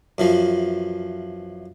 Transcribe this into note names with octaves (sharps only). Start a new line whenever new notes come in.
F#2 E3 F3